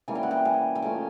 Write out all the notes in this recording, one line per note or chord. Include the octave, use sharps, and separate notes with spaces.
E3 G3 A#3 C#4 G#5
G5
F#5
G5
G#5
G5
F3 A3 C#4 G#5